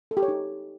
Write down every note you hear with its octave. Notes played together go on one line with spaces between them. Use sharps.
A4
G4
C#5
D#4